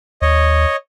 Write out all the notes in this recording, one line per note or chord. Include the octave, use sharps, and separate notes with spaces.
D#2 C#5 D#5